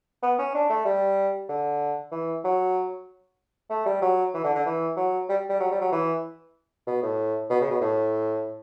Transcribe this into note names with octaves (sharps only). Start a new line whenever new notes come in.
B3
C#4
D4
A3
G3
D3
E3
F#3
A3
G3
F#3
E3
D3
D3
E3
F#3
G3
G3
F#3
G3
F#3
E3
B2
A2
B2
C#3
B2
A2